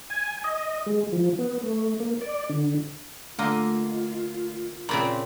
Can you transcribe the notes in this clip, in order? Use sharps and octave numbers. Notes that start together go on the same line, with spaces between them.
G#5
D#5
G#3
F3
B3
A3
A#3
D5
D3
D3 A3 A#3 F4 D#5
A#2 C#3 C4 A#5 B5